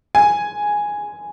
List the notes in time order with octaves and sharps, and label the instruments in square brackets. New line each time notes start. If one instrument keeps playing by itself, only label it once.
[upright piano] G#5